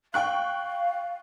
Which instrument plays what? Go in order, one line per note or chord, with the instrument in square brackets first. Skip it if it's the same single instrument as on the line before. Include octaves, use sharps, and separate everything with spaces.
[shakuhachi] F5 [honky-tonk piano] G5 C#6 F#6